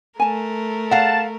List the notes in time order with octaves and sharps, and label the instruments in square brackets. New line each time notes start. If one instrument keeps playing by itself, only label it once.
[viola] A3 A#4 [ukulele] G#5 A5
[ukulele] G#4 [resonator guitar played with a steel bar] F5 F#5 [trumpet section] A5